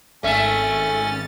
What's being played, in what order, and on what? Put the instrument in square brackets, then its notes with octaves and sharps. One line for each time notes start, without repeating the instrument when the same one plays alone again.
[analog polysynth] G#1 A6 [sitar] A3 E5 [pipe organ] C#4